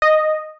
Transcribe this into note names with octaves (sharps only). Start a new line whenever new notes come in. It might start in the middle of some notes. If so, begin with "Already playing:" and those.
D#5